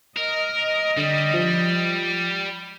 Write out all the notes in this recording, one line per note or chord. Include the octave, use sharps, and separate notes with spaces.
A#4 D#5
D3 G3
F3